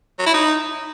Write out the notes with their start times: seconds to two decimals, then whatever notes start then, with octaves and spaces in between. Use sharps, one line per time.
0.19 F#3
0.26 E4
0.34 D#4